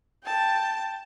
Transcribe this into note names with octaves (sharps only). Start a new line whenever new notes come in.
G5 A5